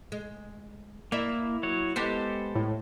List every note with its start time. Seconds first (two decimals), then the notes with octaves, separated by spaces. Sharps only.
0.12 G#3
1.12 A#3 E4 D5 E5
1.63 F#3 C#5
1.96 G#3 B3 G4 A4 C5
2.55 A2